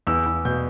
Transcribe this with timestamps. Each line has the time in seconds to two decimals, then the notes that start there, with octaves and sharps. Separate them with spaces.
0.07 E2 E6
0.26 E2
0.45 B2 G6